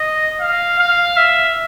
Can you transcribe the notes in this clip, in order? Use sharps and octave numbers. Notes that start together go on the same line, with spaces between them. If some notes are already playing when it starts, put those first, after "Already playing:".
Already playing: D#5
F5
F5
E5